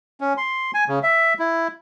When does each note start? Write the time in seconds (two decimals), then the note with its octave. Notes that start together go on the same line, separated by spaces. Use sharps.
0.21 C#4
0.37 C6
0.74 G#5
0.88 C#3
1.03 E5
1.39 E4